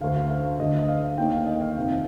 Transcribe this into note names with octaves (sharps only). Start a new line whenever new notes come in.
D2 D3 F5
F5
F5
D2 D3 D#5
D#5
F5
D#2 D#3 G5
F5
D#5
F5
F2 C3 D#3